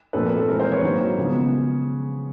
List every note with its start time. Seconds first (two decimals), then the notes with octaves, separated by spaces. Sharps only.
0.13 A#2 F3 A3 C4 A4 B4
0.25 A#4
0.36 A4
0.48 E3 G#3 C4 A#4
0.59 A#4 C5
0.72 B4 C#5
0.83 D#3 F#3 A#3
1.18 C#3 F3 G#3 B3